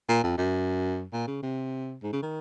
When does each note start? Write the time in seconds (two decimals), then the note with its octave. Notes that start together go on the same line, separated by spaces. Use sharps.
0.08 A#2
0.23 F2
0.38 F#2
1.13 A#2
1.27 C#3
1.43 C3
2.03 G#2
2.13 C#3
2.22 D#3